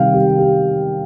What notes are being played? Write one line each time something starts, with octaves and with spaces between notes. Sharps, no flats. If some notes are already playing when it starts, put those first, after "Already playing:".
Already playing: C3 D#3 G3 F5 G5
G4
G4